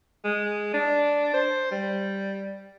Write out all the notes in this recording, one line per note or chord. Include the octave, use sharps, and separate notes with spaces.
G#3
D4
C5
G3